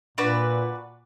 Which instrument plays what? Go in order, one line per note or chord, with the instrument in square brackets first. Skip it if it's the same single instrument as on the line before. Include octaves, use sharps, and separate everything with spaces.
[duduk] A#2 [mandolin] D4 F#4 B4